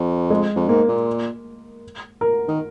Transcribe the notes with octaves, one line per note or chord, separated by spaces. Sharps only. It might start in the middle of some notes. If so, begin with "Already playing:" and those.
Already playing: F2
G#3
F2
G#2 A#3
A#2
A#4
D#3